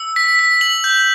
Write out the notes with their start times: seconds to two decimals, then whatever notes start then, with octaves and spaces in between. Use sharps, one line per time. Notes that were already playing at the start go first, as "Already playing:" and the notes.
Already playing: E6
0.16 B6
0.39 B6
0.61 F#7
0.84 G6